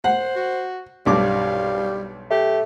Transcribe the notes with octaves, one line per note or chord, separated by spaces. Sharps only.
C5 F#5
F#4
B1 G2 G3 F5 D6
A3 G4